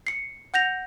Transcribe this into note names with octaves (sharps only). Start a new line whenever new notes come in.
C7 C#7
F#5 G6 A#6 F7